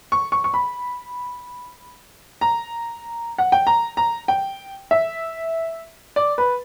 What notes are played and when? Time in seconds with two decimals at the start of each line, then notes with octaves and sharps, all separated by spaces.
0.12 C#6
0.32 C#6
0.44 C#6
0.54 B5
2.41 A#5
3.38 F#5
3.52 G5
3.67 A#5
3.97 A#5
4.28 G5
4.91 E5
6.16 D5
6.38 B4